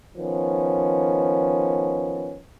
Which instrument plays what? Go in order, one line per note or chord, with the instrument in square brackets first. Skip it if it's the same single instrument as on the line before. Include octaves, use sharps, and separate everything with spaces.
[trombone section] D#3 F3 B3 C#4